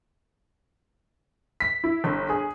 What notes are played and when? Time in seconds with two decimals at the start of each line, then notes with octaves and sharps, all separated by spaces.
1.60 B6
1.84 E4
2.04 G1
2.29 G#4